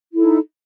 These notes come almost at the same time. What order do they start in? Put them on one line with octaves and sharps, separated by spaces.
E4 A4 D#4